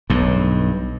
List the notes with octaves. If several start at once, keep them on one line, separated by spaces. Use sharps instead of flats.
B1 G2